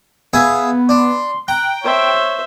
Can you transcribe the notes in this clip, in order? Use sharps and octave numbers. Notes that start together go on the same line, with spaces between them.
B3 G#4 E5 F5
D4 C6
G5 A#5 F#6
C5 C#5 E5